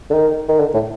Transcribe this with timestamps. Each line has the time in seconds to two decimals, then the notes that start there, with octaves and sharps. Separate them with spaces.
0.10 D3
0.14 D#3
0.48 D#3
0.60 D3
0.74 A2